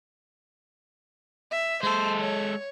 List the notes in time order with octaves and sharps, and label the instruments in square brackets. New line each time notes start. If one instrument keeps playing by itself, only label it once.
[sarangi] E5
[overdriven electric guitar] G#3 A4 [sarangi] C5
[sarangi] C#5